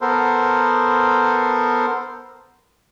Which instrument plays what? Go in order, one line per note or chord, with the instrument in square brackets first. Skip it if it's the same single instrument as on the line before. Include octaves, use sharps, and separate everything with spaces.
[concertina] B3 A4 A#4 C5